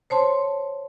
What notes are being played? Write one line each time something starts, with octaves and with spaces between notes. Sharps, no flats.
C5 C#5 A5 C6